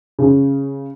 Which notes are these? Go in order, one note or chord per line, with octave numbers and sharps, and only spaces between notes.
C#3